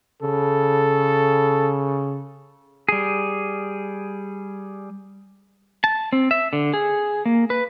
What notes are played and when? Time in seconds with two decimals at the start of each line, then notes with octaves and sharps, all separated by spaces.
0.22 C#3 A4
2.89 G3 G#4
5.84 A5
6.13 C4
6.31 E5
6.53 D3
6.73 G#4
7.25 A#3
7.50 B4